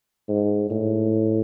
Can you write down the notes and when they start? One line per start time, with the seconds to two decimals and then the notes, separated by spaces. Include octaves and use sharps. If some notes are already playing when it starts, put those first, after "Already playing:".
0.28 G#2
0.71 A2